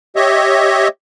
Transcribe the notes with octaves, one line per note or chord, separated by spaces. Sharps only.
G4 C#5 D#5 E5